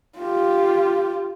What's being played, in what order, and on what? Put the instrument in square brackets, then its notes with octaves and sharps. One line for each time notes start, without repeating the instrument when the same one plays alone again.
[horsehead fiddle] F4 G4